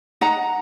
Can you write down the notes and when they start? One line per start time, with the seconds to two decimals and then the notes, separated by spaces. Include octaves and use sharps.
0.21 D#4 F#5 A#5